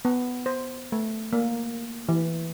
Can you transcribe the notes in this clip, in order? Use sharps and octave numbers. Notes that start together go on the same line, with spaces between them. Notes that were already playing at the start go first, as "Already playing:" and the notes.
B3
C5
A3
A#3
E3